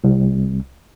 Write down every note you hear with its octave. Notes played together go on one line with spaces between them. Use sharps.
C2